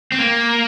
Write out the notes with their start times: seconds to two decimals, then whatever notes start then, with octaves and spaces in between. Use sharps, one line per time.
0.12 C4
0.19 A#3